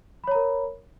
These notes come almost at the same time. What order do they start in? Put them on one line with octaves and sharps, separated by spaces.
B5 C#5 A#5 A#4